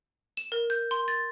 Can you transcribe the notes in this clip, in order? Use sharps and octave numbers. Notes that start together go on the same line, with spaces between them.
E7
A#4
G6
C6
A6